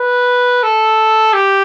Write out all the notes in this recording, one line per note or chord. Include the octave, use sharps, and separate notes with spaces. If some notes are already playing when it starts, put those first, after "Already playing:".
Already playing: B4
A4
G4